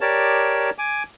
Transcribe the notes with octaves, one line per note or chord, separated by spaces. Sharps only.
G4 A#4 C#5 D5 A5
G#5 D6